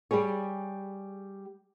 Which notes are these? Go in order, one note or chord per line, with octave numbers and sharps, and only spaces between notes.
G3 G4 G#4 C#5